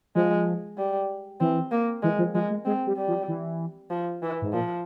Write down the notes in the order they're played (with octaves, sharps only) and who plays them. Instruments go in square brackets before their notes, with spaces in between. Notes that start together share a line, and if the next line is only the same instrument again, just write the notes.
[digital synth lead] F3 [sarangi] G#3
[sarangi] G3
[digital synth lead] E3 [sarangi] C4
[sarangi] A#3
[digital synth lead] E3 [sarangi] G#3
[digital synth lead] F3
[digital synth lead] F3 [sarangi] G#3
[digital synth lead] G#3
[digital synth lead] G#3 [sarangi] C4
[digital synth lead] G3
[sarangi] G3
[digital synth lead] F3
E3
[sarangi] F3
E3
[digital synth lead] G#2
[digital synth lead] A#2 [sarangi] F3